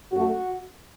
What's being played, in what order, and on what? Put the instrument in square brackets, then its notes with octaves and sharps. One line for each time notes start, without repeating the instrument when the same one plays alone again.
[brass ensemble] F#2 F#3 A3 F#4